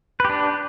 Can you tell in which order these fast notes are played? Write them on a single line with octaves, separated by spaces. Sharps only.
B4 G4 D4